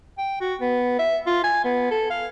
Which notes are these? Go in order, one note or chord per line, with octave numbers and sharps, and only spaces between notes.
G5
F#4
B3
E5
F4
G#5
B3
A4
F5